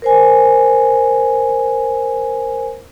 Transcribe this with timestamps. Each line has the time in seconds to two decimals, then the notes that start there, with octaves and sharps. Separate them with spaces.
0.02 A#4 C5 G#5